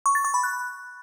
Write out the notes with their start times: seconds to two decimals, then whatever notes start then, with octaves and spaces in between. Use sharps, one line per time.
0.06 C#6
0.15 A6
0.25 C#6
0.34 B5
0.43 F#6